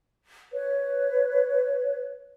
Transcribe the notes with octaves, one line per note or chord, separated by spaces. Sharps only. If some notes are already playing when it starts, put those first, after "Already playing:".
B4 C#5